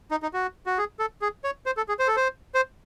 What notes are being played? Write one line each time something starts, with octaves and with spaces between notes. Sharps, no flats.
D#4
D#4
F#4
F#4
G#4
A4
G#4
C#5
C5
A4
G#4
C5
A4
C5
C5